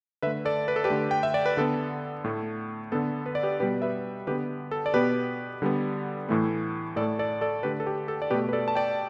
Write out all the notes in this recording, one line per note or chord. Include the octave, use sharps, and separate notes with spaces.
D3 A3 B4 E5
A4 D5
B4
A4
G4 B4
D3 A3
G5
E5
D5
B4
D3 B3 A4
A2 A3
D3 B3 A4
B4
D5
G4 B4
B2 G3 B3 G4 B4
B4 E5
D3 B3 G4 B4
A4
D5
B2 B3 G4 B4
D3 G3 B3
A2 E3 A3
A2 A4 D5
A3
A4 D5
A4 D5
D3 A3 G4 B4
A4
G4
A4
D5
B2 A3 G4 B4
B4
A4 D5
A5
D5 G5